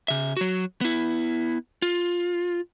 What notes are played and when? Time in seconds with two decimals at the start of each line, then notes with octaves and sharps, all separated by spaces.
0.08 C#3 E5
0.37 F#3 F#4
0.81 B3 E4
1.82 F4